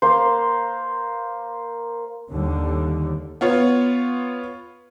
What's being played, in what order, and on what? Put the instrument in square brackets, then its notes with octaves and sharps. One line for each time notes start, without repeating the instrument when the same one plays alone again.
[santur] A#3 C5
[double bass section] D#2 D3 G3
[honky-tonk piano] B3 F4 C#5